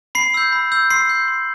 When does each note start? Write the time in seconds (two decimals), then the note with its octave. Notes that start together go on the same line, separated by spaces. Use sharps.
0.15 B5 C7
0.34 E6 G6
0.52 B5
0.72 E6 G6
0.90 C6 C7
1.10 G6
1.28 C6